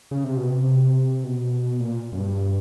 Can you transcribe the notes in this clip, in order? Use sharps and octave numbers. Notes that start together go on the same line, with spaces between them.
C#3
C3
B2
C3
B2
A#2
F#2
G2